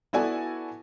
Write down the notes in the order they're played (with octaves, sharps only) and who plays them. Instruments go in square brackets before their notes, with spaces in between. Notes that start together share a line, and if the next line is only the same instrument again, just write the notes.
[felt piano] B3 E4 F#4 A4 D5 G#5